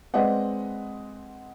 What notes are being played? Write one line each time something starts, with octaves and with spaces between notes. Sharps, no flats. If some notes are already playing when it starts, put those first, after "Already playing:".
G#3 C4 B4 D5 D#5 F#5